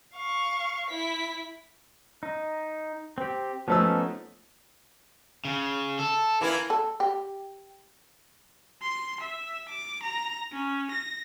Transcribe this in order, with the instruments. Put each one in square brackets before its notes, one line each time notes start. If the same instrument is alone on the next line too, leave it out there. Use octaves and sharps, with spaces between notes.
[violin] F5 C#6
E4 B6
[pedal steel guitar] D#4
C4 G4
[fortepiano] F3 A3 E6 [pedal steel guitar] B3 C#4 D#4
[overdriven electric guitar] C#3
A4
[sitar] E3 A#3 E4
[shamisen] A4
G4
[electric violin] C6
E5
D6
A#5
C#4
A#6